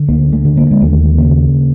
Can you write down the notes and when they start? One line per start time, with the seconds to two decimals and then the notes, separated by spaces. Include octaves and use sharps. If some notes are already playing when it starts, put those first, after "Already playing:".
Already playing: D3
0.08 D2 A#3
0.33 A3
0.45 D3
0.57 A#3
0.71 G#3
0.81 D#2 A3
1.18 C#3 A#3